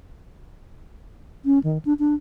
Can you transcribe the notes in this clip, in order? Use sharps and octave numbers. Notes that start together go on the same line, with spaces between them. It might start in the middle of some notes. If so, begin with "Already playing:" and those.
C#4
D#3
D4
D4